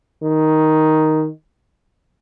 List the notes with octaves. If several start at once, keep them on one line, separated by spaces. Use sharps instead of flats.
D#3